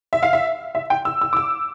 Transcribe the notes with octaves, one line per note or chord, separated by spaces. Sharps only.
E5
F5
E5
E5
G5
E6
E6
D6
E6